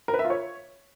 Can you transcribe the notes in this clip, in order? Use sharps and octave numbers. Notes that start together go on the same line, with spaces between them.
A#4
B4
E5
F4
C#5